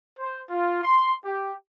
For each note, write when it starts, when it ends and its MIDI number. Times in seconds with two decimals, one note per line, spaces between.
0.18 0.40 72
0.50 0.81 65
0.83 1.12 84
1.24 1.52 67